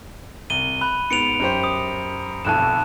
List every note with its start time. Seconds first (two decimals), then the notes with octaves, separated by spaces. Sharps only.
0.50 C2 D#7 G7
0.81 B5 F#6
1.10 G#2 B3 C#7 D7 F7
1.39 F#2 G4 C5
1.64 D#6
2.45 F1 B1 F2 A5 F#6 E7